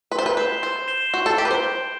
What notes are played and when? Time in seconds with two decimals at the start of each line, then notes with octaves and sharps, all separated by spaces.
0.12 B4 C6
0.19 C5
0.26 B4
0.37 B4 G6 C7 E7 G7
0.62 C5 C6
0.88 G6 C7 E7 G7
1.14 F#4 C6
1.26 A4
1.38 G4 G6 D7 G7
1.45 B4
1.51 C5